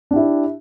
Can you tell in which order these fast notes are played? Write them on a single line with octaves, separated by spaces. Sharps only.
D4 G4 E4